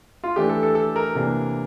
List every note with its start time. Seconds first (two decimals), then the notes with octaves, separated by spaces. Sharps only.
0.24 F4
0.36 E3 A3 D4 G4
0.49 A4
0.63 A4
0.75 A4
0.96 A#4
1.15 C3 E3 A#3 D4